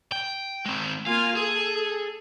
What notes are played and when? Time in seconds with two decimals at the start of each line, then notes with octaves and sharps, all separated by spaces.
0.12 G5
0.65 G#3 C4
1.06 A#3 F4 F5 G#5
1.36 G#4 A4